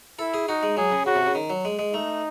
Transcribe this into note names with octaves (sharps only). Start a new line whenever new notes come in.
E4 A4
G#4
D#4 F#4
G#3
F#3 G#4
C#3
C#3 F#4
C3
C#3
D#3
F#3
G#3
G#3
A3 D#4